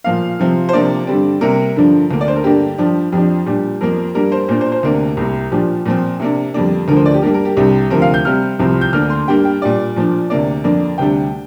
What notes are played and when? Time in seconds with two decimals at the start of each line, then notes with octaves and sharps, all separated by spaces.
0.04 A#2 F3 A#3 F5
0.39 C3 F3 C4
0.69 C5
0.73 C3 F3 A#3 D4 D5
1.07 G2 D3 G3 C4
1.41 C3 G3 A#3 A#4
1.76 G2 D3 F3 D4
2.11 D2 D3 A#3
2.21 D5
2.28 C5
2.36 A#4
2.44 G2 D3 A#3 D4 G4
2.78 G2 F3 D4
3.12 F2 F3 D4 G4
3.46 A#2 G3 D4
3.81 F2 F3 A#3 A#4
4.15 G2 G3 A#3 D4 A#4
4.32 C5
4.49 A#2 A#3 D4 C5
4.61 C5
4.72 C5
4.83 D2 C3 A#3 D4 A#4
5.17 C2 C3 A#3
5.51 A#2 F3 D4 G4
5.86 A#2 F3 C4
6.20 C3 A#3 D4
6.54 F2 D3 G3 A#3 D4
6.88 D2 D3 F3 A#4
6.96 C5
7.06 D5
7.14 G4
7.22 G2 G3 A#3 D4 A#4
7.34 A#4
7.45 G4
7.57 C2 C3 G3 D4
7.90 D2 C3 F3 C4 A#4
8.02 F5
8.14 G6
8.25 C3 G3 C4 F6
8.59 C2 C3 F3 C4
8.81 G6
8.93 D2 D3 A#3 D4 F6
9.10 C6
9.27 G2 G3 A#3 D4 G5
9.45 G5
9.62 A#2 G3 D4 D5
9.96 A#2 F3 D4
10.30 D2 C3 A#3 D4 D5
10.64 F2 D3 A#3 D4
10.98 D2 C3 G3 D4 G5